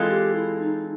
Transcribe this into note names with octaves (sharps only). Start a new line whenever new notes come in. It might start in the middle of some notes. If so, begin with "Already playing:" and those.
Already playing: E3 G#3 C4 F4 A4
G4
E4
D#4